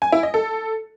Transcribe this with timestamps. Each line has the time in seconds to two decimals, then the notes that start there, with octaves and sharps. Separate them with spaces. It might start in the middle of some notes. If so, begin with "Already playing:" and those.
0.02 G#5
0.12 E4
0.23 D#5
0.34 A4